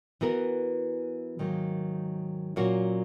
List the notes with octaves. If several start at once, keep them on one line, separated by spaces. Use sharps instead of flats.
E3 B3 F#4 A#4
G#2 D#3 F#3 A#3
A#2 F#3 A#3 C#4 F#4